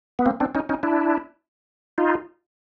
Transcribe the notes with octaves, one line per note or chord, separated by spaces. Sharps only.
B3
A#3 C4
C4 D4
C#4 D#4
C#4 D#4
D4 E4
D#4 F4